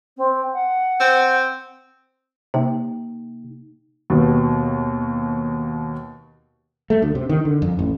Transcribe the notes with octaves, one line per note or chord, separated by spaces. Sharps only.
C4
F#5
C4
C3 A#3 D#4 G5
D#2 B2
A3
D2
C3
D#3
D3
F2
A1